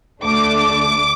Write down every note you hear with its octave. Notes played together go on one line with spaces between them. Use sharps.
D2 D3 A3 D4 D6